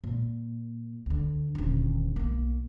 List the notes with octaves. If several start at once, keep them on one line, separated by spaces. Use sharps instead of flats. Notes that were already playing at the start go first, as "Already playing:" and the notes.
A#2
D2 D3
D#1 D3
B1 A#3